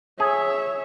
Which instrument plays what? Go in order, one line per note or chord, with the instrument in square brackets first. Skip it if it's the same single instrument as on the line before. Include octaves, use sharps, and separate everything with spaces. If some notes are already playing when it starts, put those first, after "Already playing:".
[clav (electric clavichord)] G#4 [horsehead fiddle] C#5 E5